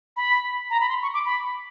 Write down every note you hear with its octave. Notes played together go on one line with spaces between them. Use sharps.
B5
A#5
B5
C6
C#6
D6
B5